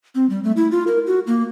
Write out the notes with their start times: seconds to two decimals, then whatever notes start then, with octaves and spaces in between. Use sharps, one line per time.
0.15 C4
0.30 G3
0.44 A3
0.56 E4
0.71 F4
0.87 A#4
1.07 F#4
1.27 A#3